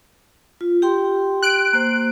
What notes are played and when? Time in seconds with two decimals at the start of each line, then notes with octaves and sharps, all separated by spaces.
0.61 F4
0.82 G4 G5 C6
1.43 F#6 D7
1.73 A#3 C5